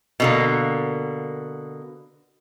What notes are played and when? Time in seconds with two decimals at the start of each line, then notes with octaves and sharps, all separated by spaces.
0.20 B2 D3 A#3